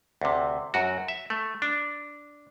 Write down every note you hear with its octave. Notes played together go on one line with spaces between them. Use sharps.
D2 C3
F#2 F#4
E5
A3
D4